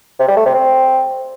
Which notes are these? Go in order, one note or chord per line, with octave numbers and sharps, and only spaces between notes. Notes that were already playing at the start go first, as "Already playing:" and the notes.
C3
G3
A3
C3
C4